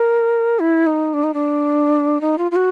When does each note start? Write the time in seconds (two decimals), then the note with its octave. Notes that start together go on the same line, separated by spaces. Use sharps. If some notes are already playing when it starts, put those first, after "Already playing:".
Already playing: A#4
0.59 E4
0.86 D#4
1.14 D4
1.23 D#4
1.34 D4
2.21 D#4
2.38 F4
2.51 F4
2.56 F#4